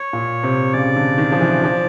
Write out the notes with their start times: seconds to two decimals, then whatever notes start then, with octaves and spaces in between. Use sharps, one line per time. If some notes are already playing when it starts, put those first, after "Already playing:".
Already playing: C#5
0.13 A#2
0.43 C3
0.74 C#3 D5
0.96 D3
1.18 D#3
1.32 F3
1.41 E3
1.64 F3